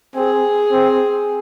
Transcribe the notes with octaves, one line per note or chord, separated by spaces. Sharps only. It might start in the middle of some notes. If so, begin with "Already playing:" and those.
C4 G#4
C4